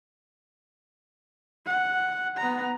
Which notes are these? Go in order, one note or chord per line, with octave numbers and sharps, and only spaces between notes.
F#5
B3 A#5